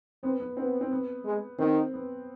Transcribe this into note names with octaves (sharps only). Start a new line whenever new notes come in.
B3 C4
B3
B3 C4
C4
B3
G#3
D#3 C4
B3